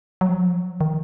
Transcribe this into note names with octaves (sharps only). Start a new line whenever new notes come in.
F#3
F3
F#3
F3
D#3